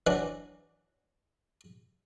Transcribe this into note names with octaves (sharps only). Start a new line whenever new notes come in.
E3 F#3 D4